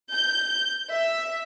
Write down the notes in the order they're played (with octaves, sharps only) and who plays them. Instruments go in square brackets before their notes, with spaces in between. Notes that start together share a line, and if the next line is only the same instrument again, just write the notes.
[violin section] G6
E5